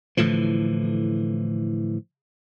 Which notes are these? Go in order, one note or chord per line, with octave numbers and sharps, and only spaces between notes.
A2 D3 E3 F3